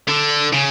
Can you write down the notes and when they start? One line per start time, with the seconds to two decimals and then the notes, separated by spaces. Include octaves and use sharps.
0.08 D3
0.53 C#3